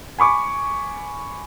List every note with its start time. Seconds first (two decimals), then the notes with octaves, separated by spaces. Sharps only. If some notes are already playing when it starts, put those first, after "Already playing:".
0.19 G#5 B5 C#6 D6